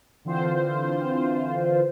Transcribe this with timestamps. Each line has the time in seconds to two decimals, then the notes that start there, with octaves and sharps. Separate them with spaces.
0.25 D3 E3 C4 F4 C5